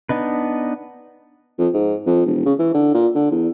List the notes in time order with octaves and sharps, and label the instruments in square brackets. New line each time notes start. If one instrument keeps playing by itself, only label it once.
[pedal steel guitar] B3 D4 D#4 B4
[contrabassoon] F2
G#2
F2
E1
C#3
E3
D3
A#2
D3
E2